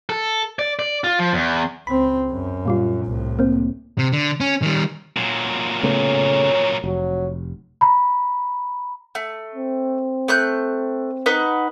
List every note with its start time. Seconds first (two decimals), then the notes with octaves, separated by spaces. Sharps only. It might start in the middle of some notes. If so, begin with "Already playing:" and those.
0.09 A4
0.59 D5
0.79 D5
1.04 F4
1.19 F3
1.33 E2
1.87 C#2 C4 B5
2.31 F#2
2.66 A#2 G3 F4
3.06 C2 A2
3.39 A#3 C4
3.98 C3
4.13 D3
4.40 C#4
4.62 D#3 G3
5.17 A#2 F#3
5.83 C#3 A3 B3 C#5
6.84 F1 F#3
7.81 A#5 B5
9.15 A3
9.55 C4
10.28 A3 F#6 G6
11.26 D#4 B4 F#5